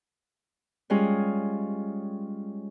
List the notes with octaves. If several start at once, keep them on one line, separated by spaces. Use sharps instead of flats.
G3 G#3 C#4 F4 G#4